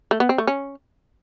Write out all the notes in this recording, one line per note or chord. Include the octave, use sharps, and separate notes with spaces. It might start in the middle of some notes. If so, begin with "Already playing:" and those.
A3
B3
C4
A3
C#4